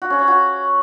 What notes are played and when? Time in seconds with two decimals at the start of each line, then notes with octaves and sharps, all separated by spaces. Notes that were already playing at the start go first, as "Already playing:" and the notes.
0.02 F#4
0.10 C#4
0.19 C#5
0.28 F#4